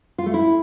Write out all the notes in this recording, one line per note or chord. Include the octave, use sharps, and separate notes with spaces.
F4
A3
E4